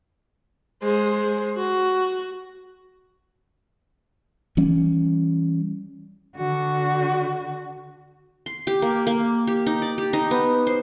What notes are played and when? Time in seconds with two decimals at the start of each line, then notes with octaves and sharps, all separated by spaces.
0.82 G#3 C5
1.58 F#4
4.57 E3 G3 C#4
6.36 D3 F#4
8.46 C6
8.67 G4
8.82 A#3
9.07 A#3
9.47 G4
9.66 D#4
9.82 D5
9.98 G4
10.13 D#4
10.31 B3
10.67 C5